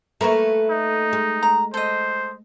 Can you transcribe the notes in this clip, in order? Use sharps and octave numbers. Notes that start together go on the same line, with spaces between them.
A3 A#3 A#4 B4 C#6
D#4
G#3
A#5
A4 C5 D#5